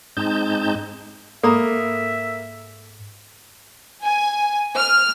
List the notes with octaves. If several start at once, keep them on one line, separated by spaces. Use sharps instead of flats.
G#2 G#3 C4 D#4 A5 G6
G#2 A#3 A4 E5 A#5 B5
G#5
F6